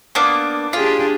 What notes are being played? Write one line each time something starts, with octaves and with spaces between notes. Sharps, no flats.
A#3 B3 D4
D4 F4 G4 G#4